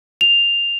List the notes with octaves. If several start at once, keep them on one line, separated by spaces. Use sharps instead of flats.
F7